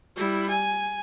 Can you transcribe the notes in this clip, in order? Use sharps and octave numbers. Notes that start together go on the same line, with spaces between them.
G3 E4
G#5